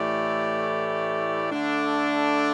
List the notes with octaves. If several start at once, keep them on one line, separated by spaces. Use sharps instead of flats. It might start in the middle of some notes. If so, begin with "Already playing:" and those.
Already playing: A2 E3 A3 G4 D5
D3 A3 D4